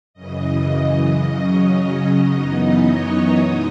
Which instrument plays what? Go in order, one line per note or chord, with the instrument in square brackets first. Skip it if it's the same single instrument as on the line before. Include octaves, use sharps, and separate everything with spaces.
[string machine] F#2 C#3 E3 D#5
D#5
C#3 F#3 C#4 D#5
F#2 E3 B3 D#4 D#5
C#5
B2 G#3 D#4 D#5